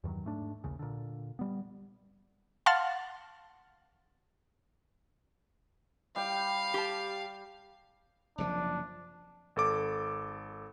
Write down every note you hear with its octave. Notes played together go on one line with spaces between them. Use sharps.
E2 G2 D#3 F#3
G#2 A3 D4
A#1 D#2 C#3
A#2 D3
G3 B3
F5 F#5 A5 C6 F6 A6
G3 F5 G5
G4 A5
F#1 C3 F3 D4
G#1 A4 D6